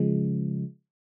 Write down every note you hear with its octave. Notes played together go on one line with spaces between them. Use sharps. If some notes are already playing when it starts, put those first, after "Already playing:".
Already playing: C#3 F3 G#3